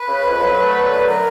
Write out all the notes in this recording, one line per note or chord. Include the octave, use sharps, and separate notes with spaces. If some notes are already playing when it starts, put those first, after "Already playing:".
Already playing: B4
C#3
F2
F#3
A3
D3
F#2 B4
F#3 A#4